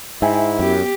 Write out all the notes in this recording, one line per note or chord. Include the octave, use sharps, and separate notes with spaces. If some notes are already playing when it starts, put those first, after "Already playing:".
G#2 E4 E5 G5 G#5
F#2 B3 G4